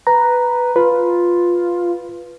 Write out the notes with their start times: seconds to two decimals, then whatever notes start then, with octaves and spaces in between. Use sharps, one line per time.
0.07 B4 A#5
0.76 F4 B4